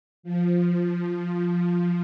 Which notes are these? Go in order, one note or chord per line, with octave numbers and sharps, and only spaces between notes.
F3